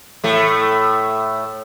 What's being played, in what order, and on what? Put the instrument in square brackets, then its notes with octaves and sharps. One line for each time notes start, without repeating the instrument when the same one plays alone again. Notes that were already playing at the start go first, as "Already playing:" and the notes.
[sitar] A2 A3